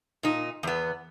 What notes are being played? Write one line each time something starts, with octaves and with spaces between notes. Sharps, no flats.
A#2 D#4
E2 B3